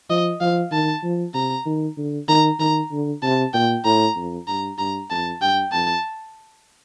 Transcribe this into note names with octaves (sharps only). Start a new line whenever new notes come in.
F3 D#5
F3 F5
D#3 A5
F3
C3 A#5
D#3
D3
D#3 A#5
D#3 A#5
D3
C3 A5
A#2 G5
A2 A#5
F2
G2 A#5
G2 A#5
F2 A5
G2 G5
F2 A5